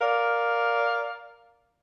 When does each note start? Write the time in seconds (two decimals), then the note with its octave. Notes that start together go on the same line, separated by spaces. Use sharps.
0.01 A#4 D5 F5